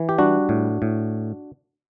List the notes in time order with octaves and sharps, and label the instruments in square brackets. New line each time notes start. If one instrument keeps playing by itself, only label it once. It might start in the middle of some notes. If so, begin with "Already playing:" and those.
Already playing: [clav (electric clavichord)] E3
G4
G3 D4 F#4
A2
A2